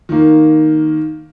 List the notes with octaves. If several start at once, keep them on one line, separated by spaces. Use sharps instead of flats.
D#3 A#3